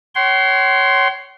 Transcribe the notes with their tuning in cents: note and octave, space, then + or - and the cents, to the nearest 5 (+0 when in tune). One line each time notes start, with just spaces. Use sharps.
C#5 +0 F#5 +45 C6 +0